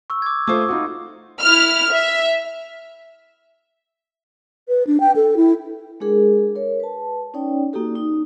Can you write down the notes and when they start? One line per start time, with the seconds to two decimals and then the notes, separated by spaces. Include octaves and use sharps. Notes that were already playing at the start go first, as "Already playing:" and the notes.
0.10 C#6 E6
0.22 D6 G#6
0.47 A3 F4 C5 D6 D#6
0.69 D#4 F4 F#4
1.41 E4 F6
1.92 E5
4.68 B4
4.87 D4
5.00 G5
5.16 A4
5.37 E4
6.00 G#3 D4 G#4 A#4
6.56 A#4 C#5
6.80 B4 A5
7.34 C#4 D#4 C#5 D5 G5
7.73 A#3 D#4 F#4 G4 A4
7.96 D#4